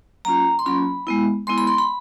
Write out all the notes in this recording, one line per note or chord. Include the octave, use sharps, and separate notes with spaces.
F#3 A#3 C#4 F4 A#5
C6
F#3 A#3 C#4 F4 B5
G#3 B3 E4
G#3 B3 E4 C6
B5
C6
B5